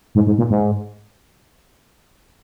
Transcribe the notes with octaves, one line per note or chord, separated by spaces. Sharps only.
G#2
G#2
A#2
G#2